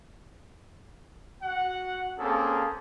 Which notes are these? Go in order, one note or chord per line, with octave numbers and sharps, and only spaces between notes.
F#4 F#5
A#3 C4 C#4 G#4 A4